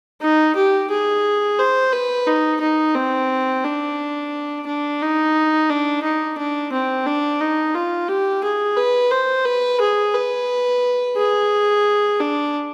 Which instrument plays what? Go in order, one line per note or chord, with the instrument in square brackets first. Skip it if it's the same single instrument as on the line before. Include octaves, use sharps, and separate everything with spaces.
[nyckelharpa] D#4
G4
G#4
C5
B4
D#4
D#4
C4
D4
D4
D#4
D4
D#4
D4
C4
D4
D#4
F4
G4
G#4
B4
C5
B4
G#4
B4
G#4
D4